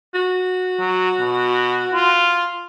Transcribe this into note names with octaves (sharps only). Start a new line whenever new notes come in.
F#4
F#3
B2
F4